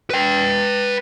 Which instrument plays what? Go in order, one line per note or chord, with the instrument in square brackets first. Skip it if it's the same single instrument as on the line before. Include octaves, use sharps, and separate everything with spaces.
[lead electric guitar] B4 G5